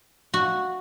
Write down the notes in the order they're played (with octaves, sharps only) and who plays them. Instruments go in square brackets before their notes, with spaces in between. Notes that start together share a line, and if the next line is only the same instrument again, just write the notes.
[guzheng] F#4